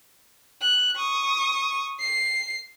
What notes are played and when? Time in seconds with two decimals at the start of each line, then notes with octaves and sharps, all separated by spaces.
0.62 F#6
0.96 C#6 D#6
2.00 C7